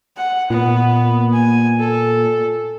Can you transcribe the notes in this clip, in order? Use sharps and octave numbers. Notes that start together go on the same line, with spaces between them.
F#5
A#2 B3
G#5
A4